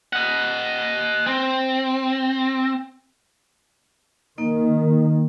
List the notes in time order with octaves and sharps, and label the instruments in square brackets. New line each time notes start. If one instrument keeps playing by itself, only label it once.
[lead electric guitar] D#5 F#5
C4
[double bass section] D#3 [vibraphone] A#3 D#4 D#5